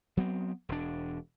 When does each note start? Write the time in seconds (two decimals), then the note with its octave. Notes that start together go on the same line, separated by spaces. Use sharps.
0.17 F#3 B3 C4
0.69 E1 D4